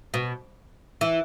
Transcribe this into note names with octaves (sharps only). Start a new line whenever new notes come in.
B2
E3